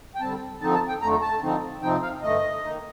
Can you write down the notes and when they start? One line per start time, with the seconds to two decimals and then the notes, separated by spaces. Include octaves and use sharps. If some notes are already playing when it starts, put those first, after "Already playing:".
0.16 G5
0.20 D3 G3 C4 A5
0.61 D3 F3 C4 D#4 A5
0.75 A5
0.88 G5
1.01 F2 D3 A3 A#5
1.22 A5
1.42 D3 F3 C4 D#4
1.82 C3 F3 C4 D#4 G5
2.02 F5
2.22 G2 D3 A3 D#5
2.64 D#3 A#3 D#4